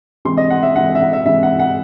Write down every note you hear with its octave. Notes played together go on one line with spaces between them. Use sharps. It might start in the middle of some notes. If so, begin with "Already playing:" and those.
C3 E3 G#3 C6
D#5
F#5
E5
C3 E3 G#3 F#5
E5
F#5
E5
C3 E3 G#3 E5
F#5
F#5